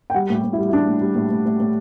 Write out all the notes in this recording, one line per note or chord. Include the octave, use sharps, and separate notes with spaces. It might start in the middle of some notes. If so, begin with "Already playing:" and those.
G5
G3 F#5
A2
G4
A2
E4
G3
E4
G3 D4
A2
G3
A2
A2
A2
A2